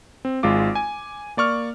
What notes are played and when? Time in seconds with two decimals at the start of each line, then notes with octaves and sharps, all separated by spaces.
0.25 C4
0.43 G#1 G#3 F4 D6
0.75 G#5
1.37 A#3 D5 C#6 F6